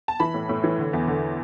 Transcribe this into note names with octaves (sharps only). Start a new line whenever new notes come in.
A5
E3 B5
A2
A2
E3
D3
E2
D3